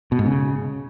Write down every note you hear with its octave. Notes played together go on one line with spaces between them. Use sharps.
B2
G#2
C#3